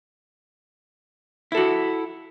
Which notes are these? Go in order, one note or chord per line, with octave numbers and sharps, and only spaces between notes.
E4 F#4 A4